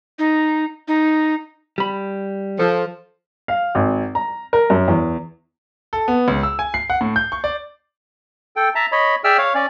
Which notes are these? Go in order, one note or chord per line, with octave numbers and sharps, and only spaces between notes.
D#4
D#4
G3 B5
F3 A4
F5
G#1
A#5
A#4
F#2
E2
A4
B3
C#2
E6
G#5
C7
F#5
A2
G6
C#6
D5
A4 G5
E5 A5 A#5
C#5 D#5 B5
G#4 D5 E5 G5 E6 F6
C#5 F5
C#4 D5